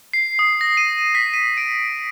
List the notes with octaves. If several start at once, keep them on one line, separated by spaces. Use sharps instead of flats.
C7
D#6
A#6
D#7
B6
D#7
D7